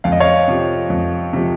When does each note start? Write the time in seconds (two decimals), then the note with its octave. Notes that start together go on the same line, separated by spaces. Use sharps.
0.04 F2 F5
0.12 D#5
0.20 C#5 F5
0.48 C3 F3
0.90 F2
1.33 C3 F3